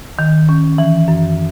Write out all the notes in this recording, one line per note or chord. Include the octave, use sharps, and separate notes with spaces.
D#3
C#4
E3
F#2